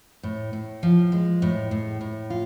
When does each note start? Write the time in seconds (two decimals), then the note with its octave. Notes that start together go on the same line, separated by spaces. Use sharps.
0.23 A2
0.53 A2
0.83 F3
1.12 G#3
1.42 A2
1.71 A2
2.01 A2
2.30 F4